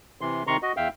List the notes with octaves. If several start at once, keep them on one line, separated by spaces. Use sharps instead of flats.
C3 E3 C6
C3 D#3 A#5 C6 C#6
F#4 D#5
E2 E5 F5 G5